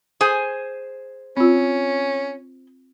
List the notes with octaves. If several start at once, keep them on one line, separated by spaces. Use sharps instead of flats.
G#4 C5 G#5
C4 C#4 F4